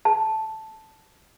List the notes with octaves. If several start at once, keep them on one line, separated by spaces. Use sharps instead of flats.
A5